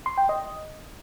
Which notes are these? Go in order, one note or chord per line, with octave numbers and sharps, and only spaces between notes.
C6
G5
D#5